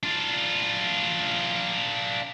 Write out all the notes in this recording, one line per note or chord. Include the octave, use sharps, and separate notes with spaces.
D4 F4